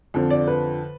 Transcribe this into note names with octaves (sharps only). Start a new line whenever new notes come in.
F2 D3 F3
D5
B4